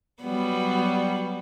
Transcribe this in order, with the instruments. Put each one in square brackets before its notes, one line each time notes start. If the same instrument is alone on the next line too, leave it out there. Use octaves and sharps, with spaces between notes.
[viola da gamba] F#3 G3 B3